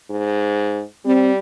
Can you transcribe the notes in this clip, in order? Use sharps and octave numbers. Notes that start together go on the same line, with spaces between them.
G#2
G3 C4